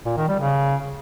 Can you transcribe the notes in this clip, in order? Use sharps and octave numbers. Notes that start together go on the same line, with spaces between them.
A#2
D#3
G3
C#3